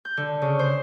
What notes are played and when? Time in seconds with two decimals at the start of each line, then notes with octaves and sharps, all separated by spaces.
0.05 G6
0.17 D3
0.42 C#3
0.59 C5